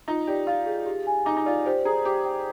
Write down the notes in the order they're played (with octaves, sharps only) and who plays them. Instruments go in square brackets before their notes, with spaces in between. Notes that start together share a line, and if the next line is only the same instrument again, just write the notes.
[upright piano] D#4 [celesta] F4
[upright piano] G4 [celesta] D5
[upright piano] F4 [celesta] F5
[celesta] G#4
G4
G#5
[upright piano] D#4 [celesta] D6
[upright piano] D#4
[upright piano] F4 [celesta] D5
[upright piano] G4 [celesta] C5
[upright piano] G#4 [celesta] A#5
[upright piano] G4 [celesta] D6
[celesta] G5